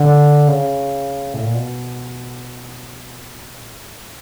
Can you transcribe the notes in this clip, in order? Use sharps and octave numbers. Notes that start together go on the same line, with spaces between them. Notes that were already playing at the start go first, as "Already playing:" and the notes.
Already playing: D3
C#3
A2
A#2
B2
A#2
A2